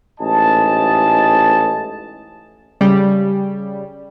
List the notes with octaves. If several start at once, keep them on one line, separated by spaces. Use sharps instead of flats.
A1 G#2 D#5 G#5 A5
C#3 G3 G4